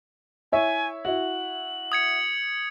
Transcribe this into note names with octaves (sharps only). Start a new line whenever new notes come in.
E4 C#5 E5 G#5
E4 F#4 F#7
D#6 G#6 C#7